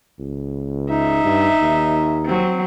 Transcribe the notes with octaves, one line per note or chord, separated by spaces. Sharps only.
C#2
D#4 E5
G2
D#2
F#3 C4